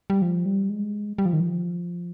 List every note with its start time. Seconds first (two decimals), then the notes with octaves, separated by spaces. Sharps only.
0.10 G3
0.22 F3
0.46 G3
0.70 G#3
1.18 G3
1.26 F3
1.33 D#3
1.40 F3